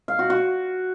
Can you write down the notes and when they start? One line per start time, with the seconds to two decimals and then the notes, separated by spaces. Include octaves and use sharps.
0.08 F5
0.19 F#4
0.30 F#4